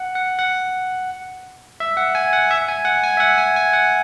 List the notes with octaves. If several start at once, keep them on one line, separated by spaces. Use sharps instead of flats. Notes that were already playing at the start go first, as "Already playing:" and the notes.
Already playing: F#5
F#5
F#5
E5
F#5
G#5
F#5
E5
G#5
F#5
G#5
E5
F#5
G#5
G#5
F#5